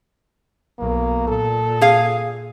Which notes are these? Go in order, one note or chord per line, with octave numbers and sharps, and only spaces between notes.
B1 A#3
A#2 A4
G#4 F5